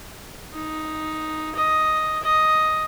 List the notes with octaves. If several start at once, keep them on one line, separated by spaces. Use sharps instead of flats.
D#4
D#5
D#5